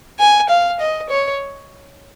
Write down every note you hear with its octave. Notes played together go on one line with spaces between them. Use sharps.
G#5
F5
D#5
C#5